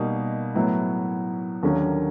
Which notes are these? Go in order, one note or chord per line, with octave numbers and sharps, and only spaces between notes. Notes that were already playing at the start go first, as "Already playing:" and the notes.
Already playing: B2 G3 A#3 D#4
A2 F#3 B3 E4
D#2 D3 F#3 A#3 C#4